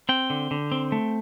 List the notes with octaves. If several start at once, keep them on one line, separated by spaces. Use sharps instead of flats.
C4 G5
D3
D3
C4
A3